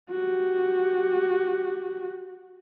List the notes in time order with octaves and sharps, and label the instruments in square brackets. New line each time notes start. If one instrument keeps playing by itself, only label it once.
[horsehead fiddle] F#4 G4